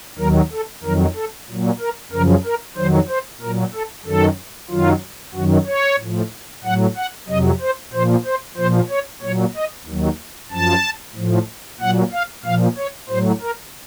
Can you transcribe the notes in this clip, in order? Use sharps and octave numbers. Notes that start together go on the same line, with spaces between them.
D#2 D#3 F#3 A#4
A4
F2 D#3 F#3 A#4
A4
A#2 F#3
A#4
F#2 C#3 F3 A#4
A#4
F2 D#3 F#3 C5
C5
A#2 A#4
F#3
A4
F#2 D#3 F#3 A4
F#2 D#3 F#3 F4
F#2 D#3 F#3 F#4
C#5
A2 F3
A2 F#3 F#5
F#5
F2 C3 F#3 D#5
C5
A#2 F3 C5
C5
A#2 F3 C5
C#5
A#2 F#3 C#5
D#5
D#2 D#3 F#3
F#2 F3 A5
A2 F3
A#2 F#3 F#5
F5
A#2 F3 F5
C#5
A2 F#3 C5
A#4